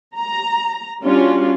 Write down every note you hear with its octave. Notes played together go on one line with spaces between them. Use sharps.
A#5
G3 C#4 D4 F4 F#4